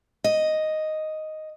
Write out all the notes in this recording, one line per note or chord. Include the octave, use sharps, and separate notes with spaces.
D#5